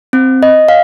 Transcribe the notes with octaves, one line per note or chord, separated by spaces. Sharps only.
C4
D#5
F5